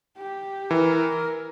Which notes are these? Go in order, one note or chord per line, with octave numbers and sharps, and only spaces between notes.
G4
E3 A#4